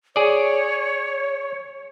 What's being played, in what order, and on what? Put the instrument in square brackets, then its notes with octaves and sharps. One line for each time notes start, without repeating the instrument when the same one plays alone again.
[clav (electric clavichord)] G#4 D5 [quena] C#5